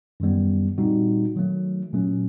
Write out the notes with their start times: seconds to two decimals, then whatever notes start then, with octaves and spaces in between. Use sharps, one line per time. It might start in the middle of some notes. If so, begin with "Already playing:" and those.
0.20 F#2 D#3 G3 B3
0.78 A#2 G3 C4 D#4 F#4
1.36 D#3 F#3 A3
1.93 A#2 F#3 A3 C#4